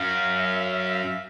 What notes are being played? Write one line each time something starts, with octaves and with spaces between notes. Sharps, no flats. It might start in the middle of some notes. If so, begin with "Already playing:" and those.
Already playing: F#2 F5
E5
F5
E5
F5
E5
F5
E5
F5
E5